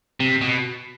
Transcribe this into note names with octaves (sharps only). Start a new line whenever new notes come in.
C3
B2